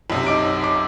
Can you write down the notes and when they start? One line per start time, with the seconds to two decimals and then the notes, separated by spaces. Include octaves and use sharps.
0.10 B1 F#2 C3
0.26 D#4 D6 D7
0.63 D6